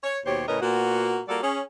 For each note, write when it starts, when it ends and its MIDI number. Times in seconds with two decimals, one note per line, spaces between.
0.04 0.19 73
0.26 0.47 39
0.26 0.47 47
0.26 0.47 67
0.26 0.47 72
0.26 0.47 73
0.48 0.60 45
0.48 0.60 49
0.48 0.60 61
0.48 0.60 70
0.48 0.60 71
0.48 0.60 75
0.61 1.21 46
0.61 1.21 58
0.61 1.21 59
0.61 1.21 66
1.28 1.39 55
1.28 1.39 58
1.28 1.39 65
1.28 1.39 66
1.28 1.39 69
1.28 1.39 74
1.43 1.61 61
1.43 1.61 68